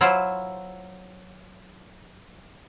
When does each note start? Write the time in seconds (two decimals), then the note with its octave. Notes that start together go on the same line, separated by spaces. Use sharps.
0.01 F#3 E4 F4 C5